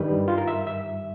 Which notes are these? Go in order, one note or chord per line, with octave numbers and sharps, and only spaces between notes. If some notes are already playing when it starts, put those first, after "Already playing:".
Already playing: G2 D#3 G3 B4
F4
A#4
E5
E5